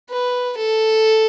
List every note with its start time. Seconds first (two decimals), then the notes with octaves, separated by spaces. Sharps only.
0.11 B4
0.57 A4